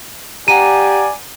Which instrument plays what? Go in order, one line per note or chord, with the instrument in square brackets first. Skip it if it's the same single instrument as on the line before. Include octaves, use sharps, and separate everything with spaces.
[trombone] G4 [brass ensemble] D5 G#5 [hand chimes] F#5 A#5 [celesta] D#7